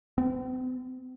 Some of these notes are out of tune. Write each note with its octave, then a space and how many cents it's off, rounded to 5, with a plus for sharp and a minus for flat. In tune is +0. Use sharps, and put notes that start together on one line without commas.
C4 -45